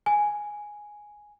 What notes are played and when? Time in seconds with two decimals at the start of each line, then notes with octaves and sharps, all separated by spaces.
0.06 G#5